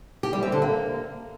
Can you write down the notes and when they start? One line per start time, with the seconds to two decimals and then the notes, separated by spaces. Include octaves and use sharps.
0.23 G4
0.33 G3
0.43 C4
0.52 D3
0.62 A#3